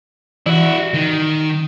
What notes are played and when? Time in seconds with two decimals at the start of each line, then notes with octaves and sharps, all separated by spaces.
0.46 E3 E4 F#4
0.94 D#3